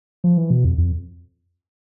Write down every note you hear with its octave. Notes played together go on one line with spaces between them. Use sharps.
F3
E3
B2
F2
F2